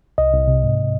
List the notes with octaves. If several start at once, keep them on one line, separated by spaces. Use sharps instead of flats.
C2 D#5
C2
C3
G#2